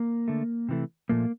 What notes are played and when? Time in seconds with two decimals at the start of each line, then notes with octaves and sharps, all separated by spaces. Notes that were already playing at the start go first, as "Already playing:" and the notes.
Already playing: A#3
0.28 D3 A3
0.69 C3 E3 A3
1.09 A#2 F3 A3 A#3